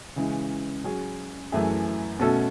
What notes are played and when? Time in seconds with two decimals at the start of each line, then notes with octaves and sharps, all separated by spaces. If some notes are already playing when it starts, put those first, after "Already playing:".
0.16 C#3 E3 G#3
0.84 F#3 C#4 G#4
1.52 F#2 E3 A3 E4 G#4
2.20 B2 A3 C#4 F#4 A4